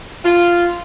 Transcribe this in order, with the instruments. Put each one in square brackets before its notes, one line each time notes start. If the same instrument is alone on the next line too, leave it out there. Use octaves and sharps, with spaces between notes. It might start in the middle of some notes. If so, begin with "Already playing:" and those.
[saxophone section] F4